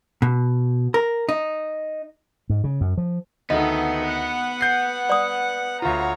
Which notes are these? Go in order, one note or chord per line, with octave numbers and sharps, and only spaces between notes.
B2
A#4
D#4
G#2
C#3
F#2
F3
D2 D#3 B3 A4 D#5
F#5
G6 C7
D5 D#6
D2 F4 C#5 A#5